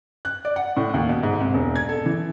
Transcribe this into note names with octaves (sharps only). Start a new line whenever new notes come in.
F#6
D5
F#5
A2
D#2
B2
G#2
C2
E1
G#6
A4
E3